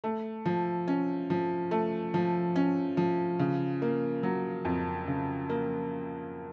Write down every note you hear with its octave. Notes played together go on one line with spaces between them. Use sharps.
A3
F3
C#4
F3
A3
F3
C#4
F3
C#3
A#3
F#3
F2
C#3
A#3